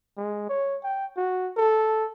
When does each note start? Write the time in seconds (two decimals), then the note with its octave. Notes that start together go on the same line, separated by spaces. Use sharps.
0.18 G#3
0.49 C#5
0.84 G5
1.17 F#4
1.57 A4